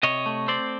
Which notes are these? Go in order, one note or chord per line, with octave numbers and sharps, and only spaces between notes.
C3 C#5 D#5
A3
C4 C5 D5